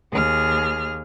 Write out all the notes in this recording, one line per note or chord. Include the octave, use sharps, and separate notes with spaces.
D#2 G#4 F6